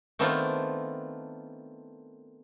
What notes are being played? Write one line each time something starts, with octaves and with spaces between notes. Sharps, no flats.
D#3 A3 B3 C4 D4 F4